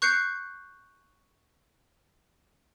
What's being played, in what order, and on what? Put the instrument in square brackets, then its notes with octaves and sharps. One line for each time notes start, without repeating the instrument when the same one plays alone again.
[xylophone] C#6 F#6 G6 C7 C#7